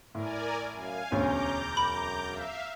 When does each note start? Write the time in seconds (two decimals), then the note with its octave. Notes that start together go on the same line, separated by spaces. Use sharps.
0.15 A2 A#4 D5 G#5
0.77 F#2 F5 G#5
1.12 E1 D2 C#4 A#5 D6 G6
1.77 F#2 B5
2.29 E5 F5